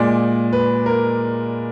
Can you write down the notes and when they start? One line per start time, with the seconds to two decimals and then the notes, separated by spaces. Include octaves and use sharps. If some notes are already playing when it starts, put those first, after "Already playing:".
Already playing: A#2 G#3 D5
0.53 B4
0.86 A#4